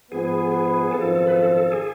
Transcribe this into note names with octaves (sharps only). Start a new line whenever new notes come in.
G#2 F3 B3 G#4
G#4
G#1 F#2 F3 A4
B4
A4
G#4